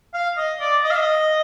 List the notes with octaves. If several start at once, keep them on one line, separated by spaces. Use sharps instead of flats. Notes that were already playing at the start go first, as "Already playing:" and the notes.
F5
D#5
D5
D#5
F5
D#5